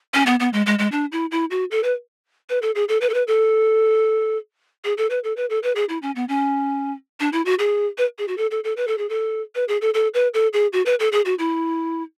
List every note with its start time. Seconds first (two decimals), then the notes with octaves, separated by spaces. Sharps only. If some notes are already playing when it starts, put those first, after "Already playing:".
0.14 C#4
0.26 B3
0.40 B3
0.53 G#3
0.66 G#3
0.79 G#3
0.92 D4
1.12 E4
1.31 E4
1.51 F#4
1.71 A4
1.83 B4
2.50 B4
2.62 A4
2.75 G#4
2.89 A4
3.01 B4
3.09 A4
3.14 B4
3.27 A4
4.84 G#4
4.98 A4
5.10 B4
5.24 A4
5.37 B4
5.50 A4
5.63 B4
5.76 G#4
5.89 E4
6.02 C#4
6.16 B3
6.29 C#4
7.20 D4
7.33 E4
7.45 F#4
7.59 G#4
7.98 B4
8.18 G#4
8.28 F#4
8.38 A4
8.51 A4
8.64 A4
8.77 B4
8.87 A4
8.98 G#4
9.09 A4
9.55 B4
9.68 G#4
9.81 A4
9.94 A4
10.14 B4
10.34 A4
10.53 G#4
10.73 F#4
10.86 B4
11.00 A4
11.12 G#4
11.25 F#4
11.39 E4